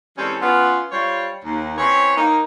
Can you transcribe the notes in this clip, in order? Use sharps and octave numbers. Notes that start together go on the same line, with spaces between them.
E3 G3 G#3 C4 C#4 A4
B3 C#4 F4
G3 F4 C5 C#5
D#2
C4 C#4 E4 B4 C#5
A#3 D#4